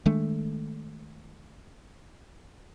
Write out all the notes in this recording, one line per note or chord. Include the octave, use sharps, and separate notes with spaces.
D#3 G#3 A3 D4